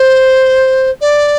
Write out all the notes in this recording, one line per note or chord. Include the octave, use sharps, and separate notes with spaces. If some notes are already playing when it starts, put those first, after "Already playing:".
Already playing: C5
D5